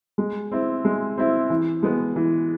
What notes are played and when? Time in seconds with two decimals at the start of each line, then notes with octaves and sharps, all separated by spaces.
0.18 G#3
0.52 C4 E4
0.85 G#3
1.17 C4 E4
1.50 E3
1.83 G#3 B3
2.16 E3